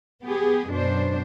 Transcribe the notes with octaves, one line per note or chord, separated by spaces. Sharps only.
B3 G4 G#4
F#2 B2 D4 C5